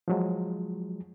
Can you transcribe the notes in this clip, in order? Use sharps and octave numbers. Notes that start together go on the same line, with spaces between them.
F3 F#3 G#3